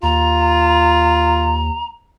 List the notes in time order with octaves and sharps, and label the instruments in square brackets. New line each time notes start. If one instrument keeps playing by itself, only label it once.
[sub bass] D#2 [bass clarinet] F4 [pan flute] A#5